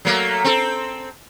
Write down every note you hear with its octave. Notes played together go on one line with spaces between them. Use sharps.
F#3 A3 A#3
C4 A4